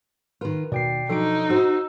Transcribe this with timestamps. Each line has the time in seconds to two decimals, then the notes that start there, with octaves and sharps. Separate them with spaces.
0.41 D#3 F4 A#4 B4
0.72 D#2 B2 D5 G5 C7
1.09 F3 F#3 D4 D#4 A4 D7
1.50 F#4 C5 E6